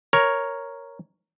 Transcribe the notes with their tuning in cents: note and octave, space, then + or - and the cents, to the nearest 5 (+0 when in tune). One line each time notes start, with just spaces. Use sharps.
A#4 +0 C#5 +0